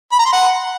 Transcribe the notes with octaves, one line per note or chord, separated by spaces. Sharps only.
B5
A#5
C6
F#5